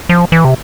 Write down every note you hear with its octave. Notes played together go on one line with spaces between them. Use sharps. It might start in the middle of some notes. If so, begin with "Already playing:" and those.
F3
E3
C3